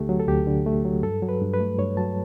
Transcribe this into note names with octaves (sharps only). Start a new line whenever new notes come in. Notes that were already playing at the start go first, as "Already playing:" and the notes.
Already playing: D2 D3 A3 G4
F#3
A4
D2 G4
D3
A3
F#3
G2 A4
F#3
B4
G2
B4
A3
G2 C#5
F#3 A5